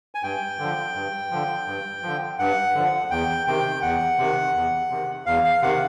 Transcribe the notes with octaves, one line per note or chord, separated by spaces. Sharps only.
G#5
G2 G5
D3 F3
G2
D3 F3
G2
D3 F3
G2 F#5
D3 F3
E2 G5
C3 D#3 G5
E2 F#5
C3 D#3
E2
C3 D#3
E2 F5
F5
C3 D#3 F#5